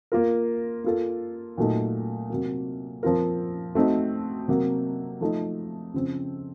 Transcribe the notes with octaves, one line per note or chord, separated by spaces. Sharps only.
A#3 F4 A#4
A#3 F4 A4
A#2 F#3 A3 D#4
C3 F#3 A#3
F3 C4 F4 A#4
A3 C4 D#4 F#4
C3 F#3 A#3
F3 A3 D#4
C#3 F3 C4